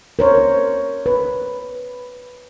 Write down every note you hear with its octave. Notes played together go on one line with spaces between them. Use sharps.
A#4 C5 C#5
B4